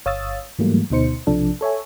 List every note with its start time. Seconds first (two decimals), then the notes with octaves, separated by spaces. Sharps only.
0.05 G1 C#5 F5 D#6 E6 A6
0.59 G#2 E3 F#3 G3 A3 A#3
0.90 D2 B2 D#4 C5 C#7
1.27 B1 C3 F3 D4 A4
1.61 A4 C#5 E5 G#5